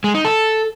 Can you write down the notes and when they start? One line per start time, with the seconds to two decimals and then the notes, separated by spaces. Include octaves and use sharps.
0.04 G#3
0.14 D#4
0.25 A4